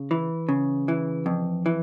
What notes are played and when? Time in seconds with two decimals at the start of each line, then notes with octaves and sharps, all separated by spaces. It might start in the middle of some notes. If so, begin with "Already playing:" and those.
Already playing: C#3
0.11 E3
0.49 C#3
0.88 E3
1.26 F2
1.66 E3